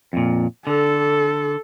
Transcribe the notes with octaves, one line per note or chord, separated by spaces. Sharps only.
F2 A#2
D3 A4